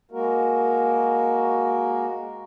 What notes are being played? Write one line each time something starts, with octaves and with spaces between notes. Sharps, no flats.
G#3 A#3 F#4 A#4